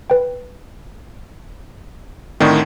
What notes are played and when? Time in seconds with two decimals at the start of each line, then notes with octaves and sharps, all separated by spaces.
0.10 B4 G5
2.40 A2 D3 D#3 C4 D5